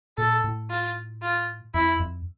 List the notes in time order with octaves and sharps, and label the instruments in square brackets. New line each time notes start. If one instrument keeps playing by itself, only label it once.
[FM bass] A#2 [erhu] A4
[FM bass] A2
[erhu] F4
F4
[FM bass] F2 [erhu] E4
[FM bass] F2